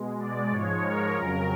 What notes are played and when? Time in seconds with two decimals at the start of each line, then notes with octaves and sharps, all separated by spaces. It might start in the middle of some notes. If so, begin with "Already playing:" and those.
Already playing: B2 G#3
0.19 D5
0.51 G#2 F3 G#3 C#5
0.84 A#4
1.16 F2 C#3 F#3